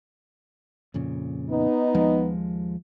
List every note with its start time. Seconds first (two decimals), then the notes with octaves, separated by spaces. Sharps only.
0.94 F2 A#2 C#3
1.49 B3 D#4
1.94 D#2 F3 G#3